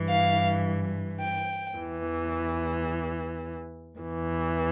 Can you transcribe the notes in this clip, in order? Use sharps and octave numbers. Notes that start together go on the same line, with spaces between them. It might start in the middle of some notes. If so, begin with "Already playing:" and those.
Already playing: G2 E3
F5
G5
E2 E3
E2 E3